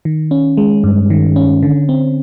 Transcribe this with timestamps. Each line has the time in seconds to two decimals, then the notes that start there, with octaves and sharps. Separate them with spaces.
0.05 D#3
0.31 C#4
0.57 G#3
0.84 G2
1.10 D#3
1.36 C#4
1.63 D3
1.89 C4